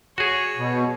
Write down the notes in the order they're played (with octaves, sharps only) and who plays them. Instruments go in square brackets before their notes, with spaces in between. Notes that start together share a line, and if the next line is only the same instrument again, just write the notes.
[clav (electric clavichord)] F#4 G#4 [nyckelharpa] C#5
[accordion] B2